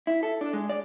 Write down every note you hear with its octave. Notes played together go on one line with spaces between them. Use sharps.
E4
A4
D4
G#3
D5